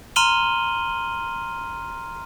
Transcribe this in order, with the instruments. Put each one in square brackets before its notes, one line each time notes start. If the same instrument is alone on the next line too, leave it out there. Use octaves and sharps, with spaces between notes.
[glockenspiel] A#5 C6 F6 D#7 F#7 G7